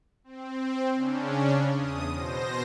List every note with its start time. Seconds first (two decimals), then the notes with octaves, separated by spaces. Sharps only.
0.24 C4
0.95 C#3 C#4 D4
1.73 E2 D#6
2.11 B2 C5 A#6